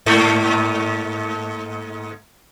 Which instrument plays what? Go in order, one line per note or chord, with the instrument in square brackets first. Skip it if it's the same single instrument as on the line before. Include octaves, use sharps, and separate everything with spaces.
[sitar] G#2 A3 A#3